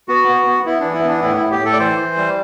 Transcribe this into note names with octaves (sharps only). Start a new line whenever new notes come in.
B3 F#4
B3
B3
B3 E4
E3 D4
E4
B3 D4
A2 E4
E4
A2
G4
A2
A4
D5
E3 C5
E3
G3